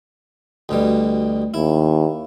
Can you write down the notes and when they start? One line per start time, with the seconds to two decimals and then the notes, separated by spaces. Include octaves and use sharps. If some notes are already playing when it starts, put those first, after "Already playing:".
0.69 D2 B2 G3
1.54 D#2 E4